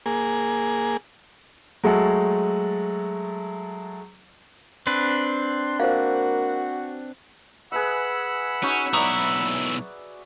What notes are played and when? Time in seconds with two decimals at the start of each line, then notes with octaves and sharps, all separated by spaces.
0.06 A#3 G#4
1.84 F#3 G#3 A3 A4
4.87 C4 D4 B4 C6
5.80 A#3 F#4 C5 F5
7.72 G#4 B4 E5 F#5 B5 E6
8.63 C#4 D#4 F#4 C#5
8.93 B1 E4 D5 E5 A#5 C#6 D#6